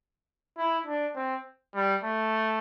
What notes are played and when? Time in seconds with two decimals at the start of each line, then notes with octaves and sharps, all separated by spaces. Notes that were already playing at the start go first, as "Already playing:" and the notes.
0.58 E4
0.87 D4
1.15 C4
1.75 G3
2.04 A3